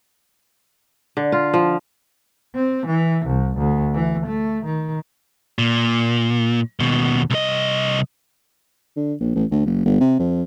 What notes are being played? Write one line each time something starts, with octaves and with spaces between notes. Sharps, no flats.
D3
F4
F3
C4
E3
C2
D2
E3
A3
D#3
A#2
D#2 B2
C2 D#5
D3
A#1
A1
D2
F#1
G1
C3
F2